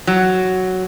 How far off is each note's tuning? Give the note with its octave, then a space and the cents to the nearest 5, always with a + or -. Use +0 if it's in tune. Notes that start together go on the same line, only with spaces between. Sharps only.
F#3 +5